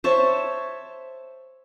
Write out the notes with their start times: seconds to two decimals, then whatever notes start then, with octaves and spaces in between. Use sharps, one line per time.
0.04 C5 C#5 E5 A5